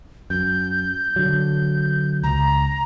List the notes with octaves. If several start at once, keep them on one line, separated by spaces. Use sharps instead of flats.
F#2 G6
D3 F#3
C#2 A#5